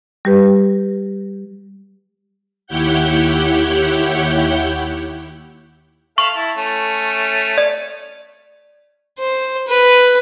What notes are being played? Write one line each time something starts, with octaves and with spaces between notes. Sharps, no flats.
G3 G4 B4
D#2 E4 G4 C#5 F#5 G6
A4 E5 F5 C#6
E4 A5
A3 C#4
D5
C5
B4